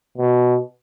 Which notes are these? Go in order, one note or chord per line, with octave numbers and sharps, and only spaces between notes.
B2